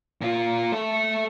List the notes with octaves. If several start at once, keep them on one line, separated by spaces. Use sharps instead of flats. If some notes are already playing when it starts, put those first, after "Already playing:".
A#2 F4
A3 A4